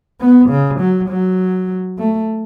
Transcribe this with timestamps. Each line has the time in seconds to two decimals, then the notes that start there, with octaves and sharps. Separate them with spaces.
0.20 B3
0.50 C#3
0.80 F#3
1.09 F#3
1.99 A3